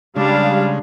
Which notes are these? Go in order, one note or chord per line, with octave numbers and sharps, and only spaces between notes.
C#3 G3 G#3 D4 F5